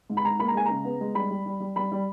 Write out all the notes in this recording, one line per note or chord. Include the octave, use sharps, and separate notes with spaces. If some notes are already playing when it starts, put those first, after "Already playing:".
G#2
B5
G#2 A#5
A#3 B5
A#5
G#3 G#5
C#3 A#5
B3
G#3
G3 B5
G3
G3
G3
G3 B5
G3